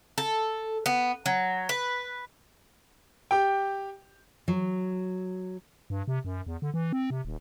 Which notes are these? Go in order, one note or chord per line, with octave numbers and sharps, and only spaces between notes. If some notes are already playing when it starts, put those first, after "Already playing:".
A4
B3
F#3
B4
G4 G5
F#3
G2
C3
F#2
E2
D3
E3
C4
C3
D#1